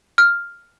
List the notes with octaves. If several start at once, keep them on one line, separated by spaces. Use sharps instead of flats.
F6